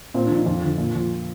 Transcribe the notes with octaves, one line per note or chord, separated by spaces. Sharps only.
A#2 C4
D4
F3
D#4
F2 F4
D3 F3
A#2
F3